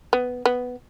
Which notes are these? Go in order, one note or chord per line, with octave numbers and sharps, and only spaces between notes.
B3
B3